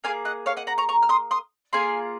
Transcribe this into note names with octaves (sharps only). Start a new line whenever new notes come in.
A#3 F4 G#4 F5 G#5
D#5 F#5
C#5 F5
D#5 F#5
F#5 A#5
A#5 C#6
A#5 C#6
F6
C6 D#6
C6 D#6
A#3 F4 G#4 G#5 C6